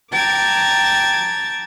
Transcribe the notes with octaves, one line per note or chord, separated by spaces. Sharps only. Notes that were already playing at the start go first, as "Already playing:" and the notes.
G5 A5 A#5 D6 G#6 A6